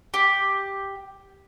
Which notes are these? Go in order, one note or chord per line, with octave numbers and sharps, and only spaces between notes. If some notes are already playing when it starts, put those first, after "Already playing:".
G4